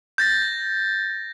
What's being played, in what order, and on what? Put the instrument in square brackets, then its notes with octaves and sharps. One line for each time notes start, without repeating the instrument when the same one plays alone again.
[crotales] G6 A6 A#6